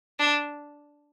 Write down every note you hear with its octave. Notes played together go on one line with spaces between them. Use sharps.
D4